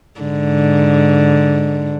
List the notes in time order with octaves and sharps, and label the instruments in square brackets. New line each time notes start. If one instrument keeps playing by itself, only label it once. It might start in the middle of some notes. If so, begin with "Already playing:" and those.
[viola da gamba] G#2 D3